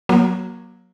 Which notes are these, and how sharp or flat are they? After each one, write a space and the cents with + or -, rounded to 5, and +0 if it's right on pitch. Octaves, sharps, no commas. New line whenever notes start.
F#3 +0 A#3 +30